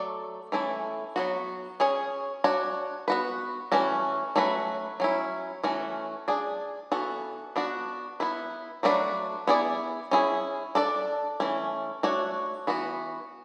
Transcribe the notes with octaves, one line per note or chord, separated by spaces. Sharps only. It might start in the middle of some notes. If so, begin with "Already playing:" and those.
Already playing: F#3 A3 A4 D5
E3 A3 C#4 E4 A4
F#3 B3 F#4
C#4 G#4 C#5
D4 F#4 C#5
B3 F#4 B4
E3 A3 C#4 F#4
F#3 A3 C#4 F#4 B4
F#3 C#4 E4
E3 A3 C#4 F#4
D4 G#4 D5
E3 B3 F#4 A4
B3 D4 F#4
B3 E4 B4
F#3 A3 D4 F#4 B4
B3 E4 G#4 D5
C#4 E4 G#4
D4 A4 D5
E3 A3 C#4
A3 D4 F#4 C#5
E3 B3 F#4